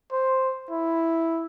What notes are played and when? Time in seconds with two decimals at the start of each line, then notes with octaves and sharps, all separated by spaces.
0.12 C5
0.71 E4